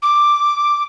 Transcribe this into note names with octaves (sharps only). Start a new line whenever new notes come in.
D6